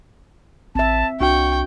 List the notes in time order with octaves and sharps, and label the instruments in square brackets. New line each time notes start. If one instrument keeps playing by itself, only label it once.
[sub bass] A1 [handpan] C4 E5 [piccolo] A5
[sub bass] C2 [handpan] D4 F#4 [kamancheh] G5 [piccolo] C#6